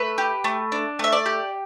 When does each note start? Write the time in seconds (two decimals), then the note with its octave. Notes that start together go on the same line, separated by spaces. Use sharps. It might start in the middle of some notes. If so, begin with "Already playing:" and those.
Already playing: A3 B4
0.18 G4
0.44 A3
0.72 D4
0.99 A3 E5
1.12 D5
1.26 G4